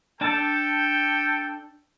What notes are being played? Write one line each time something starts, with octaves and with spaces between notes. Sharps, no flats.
D4 A4 G5 A5